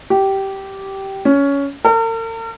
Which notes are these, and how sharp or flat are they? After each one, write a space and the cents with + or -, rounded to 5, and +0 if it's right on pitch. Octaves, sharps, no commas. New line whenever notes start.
G4 -15
C#4 +15
A#4 -45